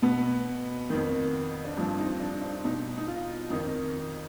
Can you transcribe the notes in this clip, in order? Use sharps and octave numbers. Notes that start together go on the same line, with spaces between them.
B2 B3
F2 D#3
D4
G2 F3 C4
D#4
D4
D4
B2 D#4
D#4
F4
F2 D#3 D#4